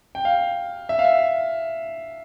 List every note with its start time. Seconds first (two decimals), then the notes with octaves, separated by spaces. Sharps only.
0.15 G5
0.25 F5
0.89 E5
0.99 F5
1.05 E5